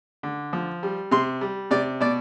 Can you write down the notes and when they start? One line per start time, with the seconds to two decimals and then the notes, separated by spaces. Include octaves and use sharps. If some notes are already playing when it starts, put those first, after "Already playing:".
0.23 D3
0.53 F3
0.83 G3
1.11 C3 C6
1.41 G3
1.71 C3 D5
2.01 B2 D5